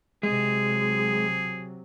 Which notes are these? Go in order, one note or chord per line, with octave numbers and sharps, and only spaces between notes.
C3 F#3 G#3 G#4